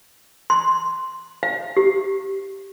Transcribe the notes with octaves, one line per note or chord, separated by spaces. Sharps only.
C6
F5
G4